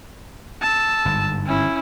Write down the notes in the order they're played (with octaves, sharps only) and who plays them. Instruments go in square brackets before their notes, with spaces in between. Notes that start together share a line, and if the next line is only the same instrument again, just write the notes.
[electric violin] A5 E6
[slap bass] G1 G#2
[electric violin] C#4 E4